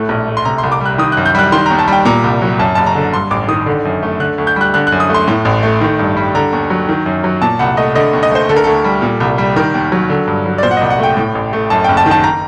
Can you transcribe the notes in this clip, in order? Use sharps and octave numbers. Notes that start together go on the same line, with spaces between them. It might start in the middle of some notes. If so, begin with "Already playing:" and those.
Already playing: A2 A3 F#6
A#1
A3
C6
C3 A#5
C2 C6
D6
G3 F#6
D#3 D#6
F#2 F#6
G6
G3 F#6
D#3 C6
D#2 A#5
A5
G3 G5
A#2 A#5
C2
F#3
F#2 A5
F#1 A5
A#5
D3
G2 C6
A1 D6
D#3 D#6
D3
F#2
A3
D3 F#6
D2
G6
G3 F#6
D3 F#6
F#6
F#2
D#6
A3
C6
A2
A1
A3
D#3
G2
G3
D3 A#5
D#2
F#3
D#3
F#2
F#3
A#2 A5
C2 F#5
A3 D#5
D3 D#5
D#2
D#5
A3 C5
D3 A4
A#4
D2 A4
G3
A#2
C2
G3
D#3 A#4
D#2
F#3
D3
G2
F#3
D5
A#2 C5
F#5
C2 D#5
F#5
A3 G5
A2
A1
A3
F#2 A5
F#1 G5
A5
D#3
A5
A#5